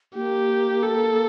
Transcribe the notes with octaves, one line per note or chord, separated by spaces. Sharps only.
A#3 G4
A4